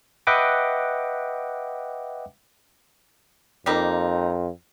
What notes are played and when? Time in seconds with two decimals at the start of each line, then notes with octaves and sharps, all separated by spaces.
0.27 B4 D#5 E5 F#5 G5 D6
3.66 F2 G3 A#3 D#4